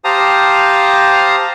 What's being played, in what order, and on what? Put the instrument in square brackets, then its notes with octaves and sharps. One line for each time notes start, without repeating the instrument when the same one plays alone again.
[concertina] G4 C5 F5 A5 A#5 D#6